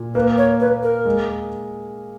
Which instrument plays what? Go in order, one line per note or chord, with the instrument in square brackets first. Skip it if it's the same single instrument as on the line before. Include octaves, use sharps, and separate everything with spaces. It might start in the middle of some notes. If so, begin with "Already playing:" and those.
Already playing: [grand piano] A#2
[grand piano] A#3 [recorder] B4
[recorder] C#5
[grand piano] A#3 [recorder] B4
[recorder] A#4
[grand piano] G#3